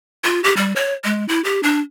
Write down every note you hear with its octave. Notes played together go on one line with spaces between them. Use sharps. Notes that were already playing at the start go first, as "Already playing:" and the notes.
F4
G4
G3
C#5
G#3
E4
G4
D4